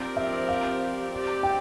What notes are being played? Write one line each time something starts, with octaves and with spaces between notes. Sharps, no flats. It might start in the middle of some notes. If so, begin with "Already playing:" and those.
Already playing: F3 C4 G4 A#4 D5
E5
F5
C4 G4 D5
G5